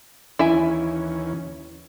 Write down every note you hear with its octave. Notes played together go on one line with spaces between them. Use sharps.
D#2 E3 C#4 E4 E5 G#5